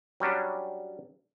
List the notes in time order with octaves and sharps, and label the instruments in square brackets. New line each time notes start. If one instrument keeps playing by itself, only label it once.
[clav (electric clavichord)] F#3 G3 C#4 D4